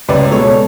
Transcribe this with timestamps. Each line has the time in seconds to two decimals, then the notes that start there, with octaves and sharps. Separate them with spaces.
0.09 C#2 B4 D5
0.31 B2 G#3 B3 A4 C#5